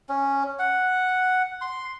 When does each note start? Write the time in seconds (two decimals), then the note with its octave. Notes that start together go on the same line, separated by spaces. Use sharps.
0.09 C#4
0.59 F#5
1.61 C6